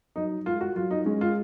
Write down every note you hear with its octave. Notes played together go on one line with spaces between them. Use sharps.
F#3 D#4
G#3 F4
F#4
F#3 F4
D#4
G#3 C#4
F4